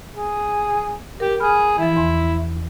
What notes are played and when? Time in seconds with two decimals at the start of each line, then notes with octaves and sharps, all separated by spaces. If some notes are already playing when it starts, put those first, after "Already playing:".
0.14 G#4
1.20 G4 A#4
1.40 G#4 B5 F6
1.78 E3 F3 E4
1.96 E2 C6